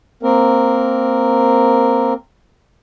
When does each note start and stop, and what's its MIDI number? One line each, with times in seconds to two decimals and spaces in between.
0.23 2.14 58
0.23 2.14 60
0.23 2.14 70